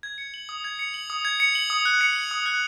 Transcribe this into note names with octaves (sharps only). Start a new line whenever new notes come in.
G#6
C#7
F#7
D#6
G#6
C#7
F#7
D#6
G#6
C#7
F#7
D#6
F#6
C#7
F#7
D#6
F#6